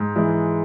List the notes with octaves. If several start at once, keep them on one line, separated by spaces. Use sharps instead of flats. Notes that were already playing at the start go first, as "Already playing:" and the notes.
Already playing: G#2
E3 G#3